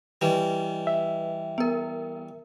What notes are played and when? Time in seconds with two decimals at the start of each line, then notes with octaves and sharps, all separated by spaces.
0.21 E3 G3 B4 D#5
0.87 E5
1.58 B3 A#4